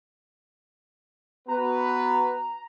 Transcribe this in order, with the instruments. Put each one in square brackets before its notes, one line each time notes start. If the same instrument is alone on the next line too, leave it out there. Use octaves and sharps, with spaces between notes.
[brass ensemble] B3 F#4 B4 [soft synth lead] A#5